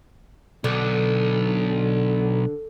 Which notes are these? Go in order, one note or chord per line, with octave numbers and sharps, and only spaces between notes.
B1 D3